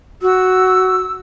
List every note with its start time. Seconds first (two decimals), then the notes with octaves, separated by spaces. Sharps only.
0.22 F#4 E6